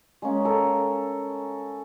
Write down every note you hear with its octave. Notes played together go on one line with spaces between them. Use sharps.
G#3 A#3 C#4
A4 A#4